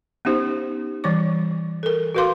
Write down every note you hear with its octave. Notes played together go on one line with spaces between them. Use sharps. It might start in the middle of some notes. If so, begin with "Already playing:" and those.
B3 C#4 D#4 G4 C5
E3 G3 C#5 D6
A4 A#4
F#4 A4 B4 F5 C6 D6